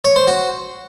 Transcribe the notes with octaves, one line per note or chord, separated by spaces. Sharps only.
C#5
C5
F#4